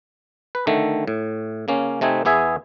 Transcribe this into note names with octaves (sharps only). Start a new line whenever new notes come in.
B4
D3 D#3 A3
A2
C#3 A#3 C#4
C3 A3 C4 D#4 G#5
E2 B3 G#4 E5 G#5